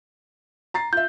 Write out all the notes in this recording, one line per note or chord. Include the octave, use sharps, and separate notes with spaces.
A#5 A6 C7
F4 E5 G6